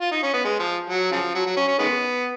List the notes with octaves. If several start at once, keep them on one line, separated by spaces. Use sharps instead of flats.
F4
D#4
C#4
B3
G#3
F3
F#3
C#3 F3
F#3
F#3
C#4
C#4
D#3 G#3 B3